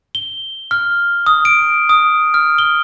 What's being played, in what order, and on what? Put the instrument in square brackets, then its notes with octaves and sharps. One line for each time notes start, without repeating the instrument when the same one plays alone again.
[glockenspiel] G7
F6
D#6
D7
D#6
F6
G7